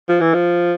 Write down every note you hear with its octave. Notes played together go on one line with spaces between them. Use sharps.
F3
E3
F3